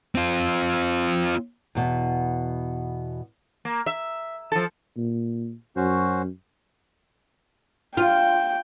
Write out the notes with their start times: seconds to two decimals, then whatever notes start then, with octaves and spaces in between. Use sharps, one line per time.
0.15 C4 F4
1.75 E2 B2
3.65 A#3
3.86 E5
4.52 F3 A4
4.97 A#2
5.76 F#2 C#4 F#4 C5
7.97 F4 G5